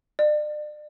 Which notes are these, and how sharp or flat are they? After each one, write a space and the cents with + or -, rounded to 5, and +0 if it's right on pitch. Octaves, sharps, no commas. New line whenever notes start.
D5 +40